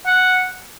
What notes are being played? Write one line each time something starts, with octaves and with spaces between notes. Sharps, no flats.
F#5